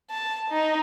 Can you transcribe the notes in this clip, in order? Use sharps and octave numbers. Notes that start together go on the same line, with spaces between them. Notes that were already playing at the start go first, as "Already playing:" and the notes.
A5
D#4